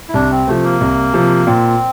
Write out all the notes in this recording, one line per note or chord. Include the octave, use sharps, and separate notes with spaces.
E4
C2 D4
C4
C3 F3 A3
A#3
C2
C3 F3
A#2 C4